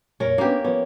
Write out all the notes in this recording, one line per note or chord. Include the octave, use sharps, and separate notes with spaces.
F2 A#2 C#4 A#4
A#3 B3 C#4 D4 G4
F3 B3 C#4